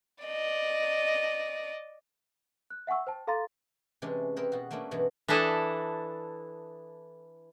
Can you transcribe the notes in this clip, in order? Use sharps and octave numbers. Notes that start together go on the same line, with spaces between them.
D5 D#5
F#6
E5 F#5 G#5 C#6 E6
C5 G5 A5
A4 F5 A#5 C6 A6
C3 E3 G#3 C#4 D4
C4 G#4 A#4 B4 C#5
B2 F#4
A3 A#3 C#4 D4 E4
G2 B2 E3 F#3 G#3
E3 D4 E4 A4 D#5